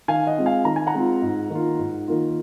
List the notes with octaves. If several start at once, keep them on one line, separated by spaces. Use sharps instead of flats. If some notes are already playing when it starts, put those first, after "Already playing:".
D#3 F5 G#5
D#5 F#5
G#3 C4 F4
F5 G#5
D#3 A#5
G#5
F#5 A#5
G#3 C4 F4
G#2
D#3 A#3 F4
G#2
D#3 A#3 F4